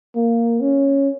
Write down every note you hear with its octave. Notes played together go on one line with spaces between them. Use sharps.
A#3
C#4